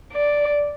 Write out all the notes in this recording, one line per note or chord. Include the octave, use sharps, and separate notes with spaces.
D5